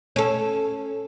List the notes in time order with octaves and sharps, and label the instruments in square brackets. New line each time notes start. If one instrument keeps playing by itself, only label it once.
[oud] C#4 A4